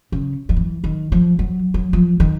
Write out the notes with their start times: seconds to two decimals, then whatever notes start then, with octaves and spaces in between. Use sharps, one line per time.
0.12 C#3
0.49 F3
0.57 E3
0.84 D#3
1.12 F3
1.39 F#3
1.74 F#3
1.93 F3
2.20 D#3